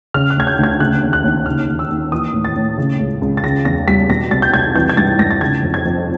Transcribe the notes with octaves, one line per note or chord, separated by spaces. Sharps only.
C#3 F6
F#6
D2 G#6
G6
D2
G#6
C#3 F#6
D#2
F#6
D#2
C#3 F6
D#2
E6
D#2
E3 D#6
A2
A6
A2
C#3
C#2
C#2
A6
C#3 A#6
E2 A#6
G3 B6
B2 A#6
C2 A6
G6
C2 G#6
E3 G6
G#6
G2 A6
G2 A#6
A6
C#3 G#6
F2
G#6
F2